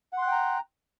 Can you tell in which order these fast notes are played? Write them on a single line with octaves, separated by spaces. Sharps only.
F#5 C6 F#6 G5 A#5